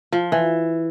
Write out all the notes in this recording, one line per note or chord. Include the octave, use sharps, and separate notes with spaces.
F3
E3